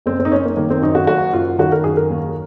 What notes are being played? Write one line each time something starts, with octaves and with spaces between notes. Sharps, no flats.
F#1 C4
C4
D#4
F#1 C#4
A#3
D#3 A#3
C4
F#2 D#4
F#4
F#1 F#4
F#1 F4
D#3 F#4
A#4
F#2 G#4
A#4
D#2